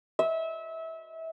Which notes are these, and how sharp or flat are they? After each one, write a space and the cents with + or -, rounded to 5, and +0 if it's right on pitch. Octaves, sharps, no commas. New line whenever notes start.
E5 -25